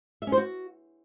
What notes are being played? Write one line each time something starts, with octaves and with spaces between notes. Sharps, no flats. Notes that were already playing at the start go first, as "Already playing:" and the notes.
E5
C#4
C5
F#4